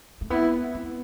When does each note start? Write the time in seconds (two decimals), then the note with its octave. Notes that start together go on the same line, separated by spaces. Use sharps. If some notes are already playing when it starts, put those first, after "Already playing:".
0.21 A3
0.30 B3 E4
0.74 B3